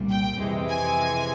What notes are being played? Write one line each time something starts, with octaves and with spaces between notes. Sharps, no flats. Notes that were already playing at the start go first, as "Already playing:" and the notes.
Already playing: C2 A#2 G3
G5
F2 C3 E3 G#3
G#5